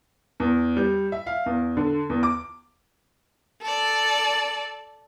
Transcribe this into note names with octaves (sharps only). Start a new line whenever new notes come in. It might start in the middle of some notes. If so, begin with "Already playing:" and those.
E2
G3
E5
F5
E2
D3
E2
D6
A4 D5